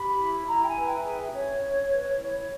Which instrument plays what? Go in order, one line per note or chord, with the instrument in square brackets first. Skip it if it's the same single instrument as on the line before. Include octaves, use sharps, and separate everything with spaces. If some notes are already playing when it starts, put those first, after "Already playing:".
Already playing: [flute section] G4 B5
E4
E4 A#5
G5
G#5
B4
G5
G#4 E5
C#4 C#5
C#4
B4
E4